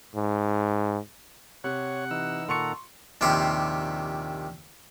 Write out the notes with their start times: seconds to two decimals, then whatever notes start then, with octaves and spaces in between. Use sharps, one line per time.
0.15 G#2
1.64 C3 C#5 F#5 F#6
2.11 E3 D#4 E6
2.49 A#2 D#3 A4 F#5 A#5 C6 C#6 C#7
3.21 A#1 D#2 C3 G4 F5 C6